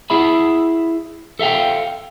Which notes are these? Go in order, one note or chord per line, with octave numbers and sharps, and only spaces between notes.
E4 G#4 E5 B5
A4 E5 F5 G5